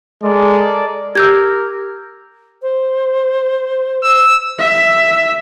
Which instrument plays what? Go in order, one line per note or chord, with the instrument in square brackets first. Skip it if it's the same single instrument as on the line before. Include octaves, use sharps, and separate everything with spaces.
[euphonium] G#3 [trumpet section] A4 A#4 D5
[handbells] G4 [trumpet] A#4 [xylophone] E6 G6 G#6
[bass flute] C5
[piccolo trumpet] E6
[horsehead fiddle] E5